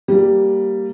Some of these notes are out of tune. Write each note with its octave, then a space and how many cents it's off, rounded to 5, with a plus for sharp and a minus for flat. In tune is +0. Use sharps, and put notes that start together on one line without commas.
G3 -5 A#3 +0